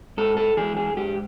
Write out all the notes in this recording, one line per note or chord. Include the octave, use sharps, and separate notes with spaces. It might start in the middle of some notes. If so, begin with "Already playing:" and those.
G#2 A4
A4
E3 G#3 G#4
G#4
G#2 G4